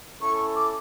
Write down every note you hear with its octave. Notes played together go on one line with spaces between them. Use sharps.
C#4 E4 A4 C#6
D6